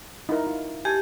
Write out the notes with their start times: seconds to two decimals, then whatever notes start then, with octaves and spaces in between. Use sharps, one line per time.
0.29 D#4 E4 A#4
0.47 F4
0.85 G4 G#5 A5